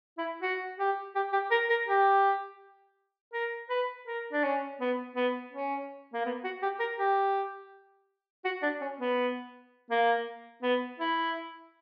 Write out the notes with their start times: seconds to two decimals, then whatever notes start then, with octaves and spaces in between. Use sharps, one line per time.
0.18 E4
0.42 F#4
0.79 G4
1.15 G4
1.33 G4
1.51 A#4
1.70 A#4
1.88 G4
3.34 A#4
3.70 B4
4.07 A#4
4.33 D4
4.43 C#4
4.80 B3
5.16 B3
5.53 C#4
6.14 A#3
6.26 B3
6.44 F#4
6.62 G4
6.80 A#4
6.99 G4
8.45 F#4
8.62 D4
8.81 C#4
9.00 B3
9.90 A#3
10.63 B3
10.99 E4